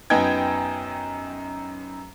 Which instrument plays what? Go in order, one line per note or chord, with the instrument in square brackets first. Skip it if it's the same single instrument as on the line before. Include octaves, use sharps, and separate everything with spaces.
[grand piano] F#2 B3 D#4 G5 G#6